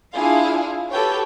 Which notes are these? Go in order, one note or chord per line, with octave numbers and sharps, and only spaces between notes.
D4 E4 F4 G#4 F5
F#4 G4 A4 B4 C#5 G5